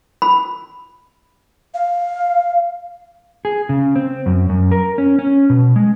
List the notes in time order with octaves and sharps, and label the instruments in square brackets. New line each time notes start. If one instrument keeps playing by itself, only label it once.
[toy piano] B5
[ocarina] F5
[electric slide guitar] G#4
C#3
C4
F#2
F#2
A#4
C#4
C#4
B2
G#3